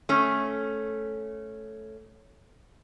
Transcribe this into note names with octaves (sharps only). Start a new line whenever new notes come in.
A3 C#4